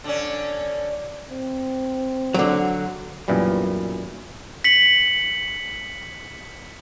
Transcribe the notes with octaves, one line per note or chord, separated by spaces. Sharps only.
D3 C#4
C4
D3 F#3
B1 F#2 A#2 E3 G3
B6 C#7 F#7